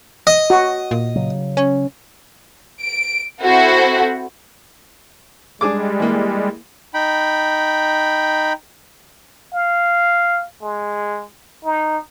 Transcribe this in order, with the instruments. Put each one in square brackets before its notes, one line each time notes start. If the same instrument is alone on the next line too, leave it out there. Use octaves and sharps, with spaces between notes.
[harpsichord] D#5
[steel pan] F#4
[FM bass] A#2
[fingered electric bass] C#3 F#3
[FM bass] C#4
[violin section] D7
C4 E4 F#4 A4 C5
[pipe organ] G3 G#3 [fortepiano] D4 G#4 D6
[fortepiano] E3 A#3
[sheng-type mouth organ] D#4 G5 B5
[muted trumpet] F5
G#3
D#4